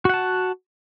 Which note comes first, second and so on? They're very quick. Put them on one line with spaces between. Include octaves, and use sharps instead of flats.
F#4 F#5 A5